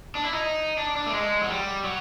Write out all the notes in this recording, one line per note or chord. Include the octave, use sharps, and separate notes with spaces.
D4
E4
D#4
D4
D4
A3
G#3
F#3
G3
F#3